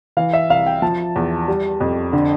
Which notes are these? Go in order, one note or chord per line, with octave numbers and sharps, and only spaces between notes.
E3 F5
E5
C2 F5
G5
F3 A5
E2
G3
F2
D3